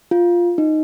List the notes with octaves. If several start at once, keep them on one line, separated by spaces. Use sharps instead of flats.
F4
D#4